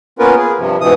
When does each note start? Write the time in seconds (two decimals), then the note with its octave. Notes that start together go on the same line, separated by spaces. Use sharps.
0.19 A#3 B3 C#4 F4 A#4 B4
0.38 G#4
0.59 G2 C3 F3
0.81 G#2 B2 E3 D#6